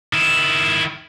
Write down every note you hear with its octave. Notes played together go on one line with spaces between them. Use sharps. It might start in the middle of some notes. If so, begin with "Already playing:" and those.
D#3 E4